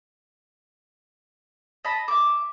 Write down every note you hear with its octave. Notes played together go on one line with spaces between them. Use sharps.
D#5 A5 B5
E5 D6